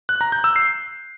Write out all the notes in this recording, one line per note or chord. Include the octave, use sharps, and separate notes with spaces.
F#6
A#5
G6
E6
C7